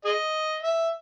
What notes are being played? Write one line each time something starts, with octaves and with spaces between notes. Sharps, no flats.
G#4 D#5
E5